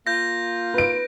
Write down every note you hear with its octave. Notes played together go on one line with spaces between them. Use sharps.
A#3 F4 G6 A#6
B4 D7